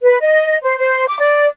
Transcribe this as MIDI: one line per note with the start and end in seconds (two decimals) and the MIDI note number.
0.01 0.17 71
0.21 0.55 75
0.63 0.77 72
0.78 1.04 72
1.07 1.18 86
1.19 1.47 74